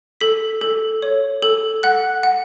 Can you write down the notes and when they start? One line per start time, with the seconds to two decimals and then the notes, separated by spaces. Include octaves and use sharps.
0.21 A4 B6
0.61 A4
1.02 C#5
1.42 A4
1.83 F#5 F#6
2.23 F#5